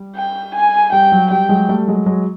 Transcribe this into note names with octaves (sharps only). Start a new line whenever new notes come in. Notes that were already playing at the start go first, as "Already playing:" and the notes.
Already playing: G3
G5
G#5
G3 G5
F#3
G3 G5
F#3 G#3
G3 A3
F#3 G#3
F#3 G#3